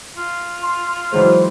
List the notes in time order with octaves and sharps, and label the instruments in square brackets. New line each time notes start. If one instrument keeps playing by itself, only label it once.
[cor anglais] F4
[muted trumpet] C6
[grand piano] E3 F#3 G#3 [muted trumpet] C5